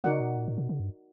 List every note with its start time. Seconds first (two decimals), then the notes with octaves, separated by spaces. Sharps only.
0.04 C#3 D#4 F#4 A#4 D5 F#5
0.20 B2
0.37 A#2
0.48 A2
0.58 B2
0.69 C#3
0.80 G2